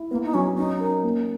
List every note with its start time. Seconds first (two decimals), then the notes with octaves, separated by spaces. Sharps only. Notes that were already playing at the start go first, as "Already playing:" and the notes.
Already playing: E4
0.11 A#3 B3
0.25 D#4
0.34 F#3 C#4
0.58 C#4 D#4
0.80 A#4
1.03 A#3